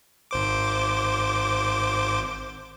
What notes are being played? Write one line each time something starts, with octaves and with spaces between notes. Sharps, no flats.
G#1 C5 D6